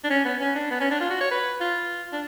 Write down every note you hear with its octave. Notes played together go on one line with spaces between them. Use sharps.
D4
C#4
B3
C#4
D4
B3
C#4
D4
F4
F#4
C#5
B4
F4
D4